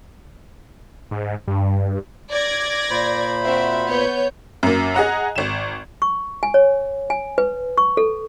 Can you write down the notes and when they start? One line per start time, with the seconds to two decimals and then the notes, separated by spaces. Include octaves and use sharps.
1.11 G#2
1.48 G2
2.32 D5 G#6 A#6
2.91 A#2 C5 B5
3.43 C4 F#4 E5
3.87 B3 C#5 G6
4.63 F#2 A#3
4.95 G#4 D#5 F#5 A#5
5.36 G#1 E7
6.02 C#6
6.43 G#5
6.54 C#5
7.10 G#5
7.38 B4
7.78 C#6
7.97 A4